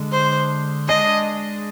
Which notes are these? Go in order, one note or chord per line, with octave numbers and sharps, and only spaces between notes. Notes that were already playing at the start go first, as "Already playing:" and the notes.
Already playing: D3 G#3 D4
C5
G#3 D4 G#4 D#5